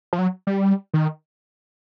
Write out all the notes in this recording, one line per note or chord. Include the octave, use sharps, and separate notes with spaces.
F3
F#3
G3
D#3